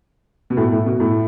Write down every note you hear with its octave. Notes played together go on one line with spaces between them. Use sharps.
B2
A2
A2
B2
A2